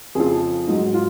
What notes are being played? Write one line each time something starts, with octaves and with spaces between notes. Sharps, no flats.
F2 C#3 F3 G#4
G#2 F#3 D#4
F4